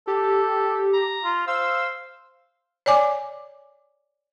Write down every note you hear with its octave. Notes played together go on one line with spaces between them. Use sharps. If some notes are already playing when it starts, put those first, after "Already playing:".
G4 A4
A#5
F4
C5 F5 E6
C#5 D5 G#5 D6